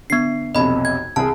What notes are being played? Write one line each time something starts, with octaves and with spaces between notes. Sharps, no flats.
D3 B3 C7
B1 F2 C3 D#5 B5
G#6
C2 G#4 A5